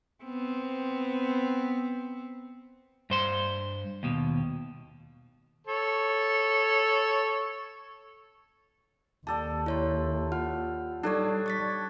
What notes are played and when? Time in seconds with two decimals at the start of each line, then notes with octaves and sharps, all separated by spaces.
0.23 B3 C4
3.10 G2 C5 C6
4.03 D#2 B2
5.67 A4 C#5
9.27 D#2 G4 A4 D5 A5
9.66 E4 C#5 C6
10.32 F4 F#5 F6
11.03 G3 D4 D#4 A4 C#5 D5
11.46 C#6 A6 B6